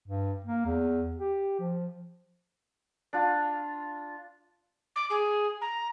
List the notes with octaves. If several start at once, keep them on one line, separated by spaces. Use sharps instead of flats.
G2
A#3
E2
G4
F3
D4 F4
D6
G#4
A#5